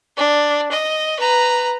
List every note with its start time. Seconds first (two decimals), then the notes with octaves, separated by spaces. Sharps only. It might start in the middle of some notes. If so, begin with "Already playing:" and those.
0.17 D4
0.72 D#5
1.19 B4 A#5